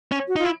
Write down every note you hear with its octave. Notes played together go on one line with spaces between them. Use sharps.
C#4
F#4
D#4 F4
E4